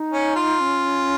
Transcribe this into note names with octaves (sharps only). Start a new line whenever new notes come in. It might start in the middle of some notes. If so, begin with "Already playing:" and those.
Already playing: D#4
C#4
F4
C#4